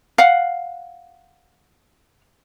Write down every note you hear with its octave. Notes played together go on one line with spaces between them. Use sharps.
F5 F#5